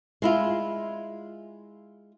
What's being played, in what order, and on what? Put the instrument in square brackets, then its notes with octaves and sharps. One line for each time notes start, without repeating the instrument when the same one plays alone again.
[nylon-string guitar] G#3 E4 F4